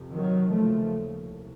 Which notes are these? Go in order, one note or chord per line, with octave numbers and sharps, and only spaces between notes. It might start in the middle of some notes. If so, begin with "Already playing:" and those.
Already playing: F2 C3
D#3 F#3
D#2 C#3 F3 A3
C2